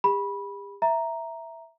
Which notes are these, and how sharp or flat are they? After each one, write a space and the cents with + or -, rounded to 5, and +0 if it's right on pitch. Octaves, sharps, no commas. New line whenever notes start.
G4 +45 B5 -15
E5 +0 A#5 +0